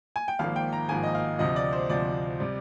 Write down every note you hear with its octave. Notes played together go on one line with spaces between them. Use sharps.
G#5
G5
G#1 G#2 F3 A#3 F5
G5
A#5
G#1 G#2 F3 A#3 G#5
D#5
F5
D2 C3 F3 D#5
D5
C5
D2 C3 F3 D5
C3 G3